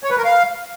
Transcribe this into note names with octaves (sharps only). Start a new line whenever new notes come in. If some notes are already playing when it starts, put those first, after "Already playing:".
C#5
B4
A#4
F5